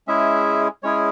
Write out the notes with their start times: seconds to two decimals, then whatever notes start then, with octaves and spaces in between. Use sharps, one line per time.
0.08 G#3 C#4 E4 G#4 E5
0.83 G#3 C#4 E4 G#4 C#5